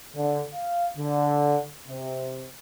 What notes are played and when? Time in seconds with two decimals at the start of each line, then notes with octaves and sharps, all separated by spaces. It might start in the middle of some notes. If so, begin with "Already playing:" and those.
0.16 D3
0.54 F5
0.98 D3
1.88 C3